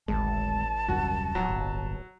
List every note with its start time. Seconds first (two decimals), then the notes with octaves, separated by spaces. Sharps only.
0.08 D1 G#1 G#3 A5
0.88 D#1 C2 F#2 F#4
1.35 D1 F#3
1.48 G1